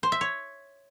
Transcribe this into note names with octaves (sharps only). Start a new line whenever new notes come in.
C5
E5
C#5